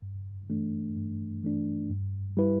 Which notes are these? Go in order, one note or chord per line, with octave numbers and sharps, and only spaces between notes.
G2
E3 A3 D4
G2
E3 A3 D4
G2
G3 E4 B4